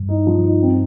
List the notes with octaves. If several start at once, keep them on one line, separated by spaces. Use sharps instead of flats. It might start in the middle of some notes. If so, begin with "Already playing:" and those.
Already playing: G2
D#4
F3
D#4
C4